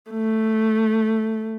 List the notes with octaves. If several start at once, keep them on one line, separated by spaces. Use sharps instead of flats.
A3